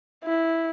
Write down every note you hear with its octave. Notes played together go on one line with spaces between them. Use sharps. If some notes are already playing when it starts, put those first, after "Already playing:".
E4